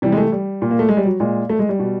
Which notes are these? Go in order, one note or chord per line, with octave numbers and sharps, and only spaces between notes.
C3 E3 G3
G#3
A3
G3
A#2
A#3
A3
G#3
G3
F#3
A#2 G#3
A3
G#3
G3
B2